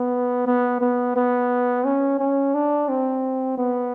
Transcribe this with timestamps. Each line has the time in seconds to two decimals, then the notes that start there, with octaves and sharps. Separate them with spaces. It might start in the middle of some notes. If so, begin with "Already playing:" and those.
Already playing: B3
0.47 B3
0.81 B3
1.16 B3
1.85 C#4
2.19 C#4
2.54 D4
2.89 C4
3.58 B3